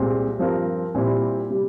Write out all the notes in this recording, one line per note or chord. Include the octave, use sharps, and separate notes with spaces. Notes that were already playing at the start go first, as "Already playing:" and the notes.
Already playing: C2 A#2 G#3 C4
G2 F3 C4 F4 A#4
A#2 G3 C4 E4 G4
C3 G3